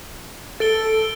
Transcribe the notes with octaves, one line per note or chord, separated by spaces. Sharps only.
A4 A6 D7 G7